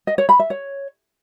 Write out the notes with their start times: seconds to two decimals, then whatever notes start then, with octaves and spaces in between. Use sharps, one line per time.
0.07 D#5
0.18 C#5
0.29 B5
0.39 E5
0.50 C#5